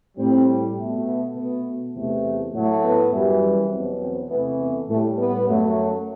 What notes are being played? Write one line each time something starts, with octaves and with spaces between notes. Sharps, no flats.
A2 G3 C4
B2 A3
B3
B2 A3 B3
E2 C3 E3 A3
A2 F#3 A3
B3
F#2 E3 G3
E2 B2 F#3 C4
C4
E2 C3 E3 A3 B3
B3
A2 G3 A3
B3
F#2 F#3 A3